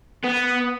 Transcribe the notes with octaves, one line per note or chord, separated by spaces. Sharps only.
B3